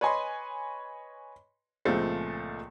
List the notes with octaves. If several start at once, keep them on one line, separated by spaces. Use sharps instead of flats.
B4 C#5 D#5 G#5 B5 C6
C#2 A#2 F3 G#3 A3 C4